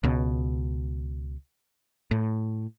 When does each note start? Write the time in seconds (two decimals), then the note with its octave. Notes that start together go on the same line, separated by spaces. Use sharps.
0.04 C#2 B2
2.11 A2